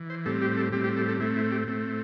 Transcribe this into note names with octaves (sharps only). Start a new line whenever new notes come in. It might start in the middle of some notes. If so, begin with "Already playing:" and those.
Already playing: E3
C5
A2 G3 C4 A4
G4
A4
A2 G3 C4 G4
G4
A4
A4
A2 A3 C4 E4
E4
G4
A2 A3 C4